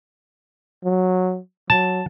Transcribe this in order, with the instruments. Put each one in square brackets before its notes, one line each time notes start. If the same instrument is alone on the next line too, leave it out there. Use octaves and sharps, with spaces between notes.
[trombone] F#3
[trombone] F#3 [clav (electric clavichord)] A5